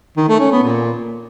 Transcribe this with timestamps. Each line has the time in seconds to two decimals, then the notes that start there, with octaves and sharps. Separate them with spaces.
0.17 D#3
0.28 A3
0.40 C#4
0.52 B3
0.63 A#2